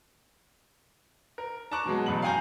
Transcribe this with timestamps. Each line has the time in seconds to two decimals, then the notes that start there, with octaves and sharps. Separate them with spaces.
1.38 A#4
1.72 A5 A#5 C#6 D6 F#6
1.86 B2 F#3 G#3
2.06 A1 F#2 B5 F#7
2.22 F5 G5 G#5 A#5 G6